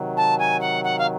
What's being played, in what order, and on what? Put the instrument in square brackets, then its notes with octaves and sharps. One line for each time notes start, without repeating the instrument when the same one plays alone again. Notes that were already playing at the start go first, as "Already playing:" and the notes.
Already playing: [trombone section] C3 D#3 F#3
[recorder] A5
G#5
F#5
F#5
F5